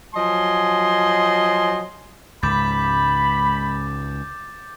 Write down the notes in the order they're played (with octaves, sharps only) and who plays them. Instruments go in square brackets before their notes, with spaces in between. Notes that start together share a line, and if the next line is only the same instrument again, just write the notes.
[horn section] F3 F#3 D#5 G#5 C6
[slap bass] C#2 G#2 [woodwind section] B5 [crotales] D6 G6 A6